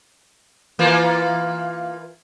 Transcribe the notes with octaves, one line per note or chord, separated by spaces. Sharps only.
E3 A#3 F4